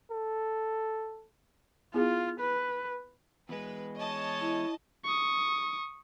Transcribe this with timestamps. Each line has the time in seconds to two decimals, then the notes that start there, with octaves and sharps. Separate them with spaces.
0.11 A4
1.94 B3 E4 F4 G#4
2.40 B4
3.49 E2 G#3 B4
3.98 C#5 D#5 A5
4.41 E4
5.04 C#6 D#6